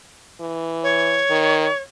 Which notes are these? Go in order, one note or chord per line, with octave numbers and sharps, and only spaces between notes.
E3
C#5
D#3